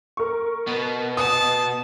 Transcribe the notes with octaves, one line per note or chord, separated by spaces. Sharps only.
A#4 C#6
B2 B3
A5 D#6